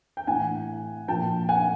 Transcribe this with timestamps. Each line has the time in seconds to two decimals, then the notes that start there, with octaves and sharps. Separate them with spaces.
0.17 G5
0.27 A2 E3 F#5 G#5
1.08 A#2 F3 G5 A5
1.49 F#5 G#5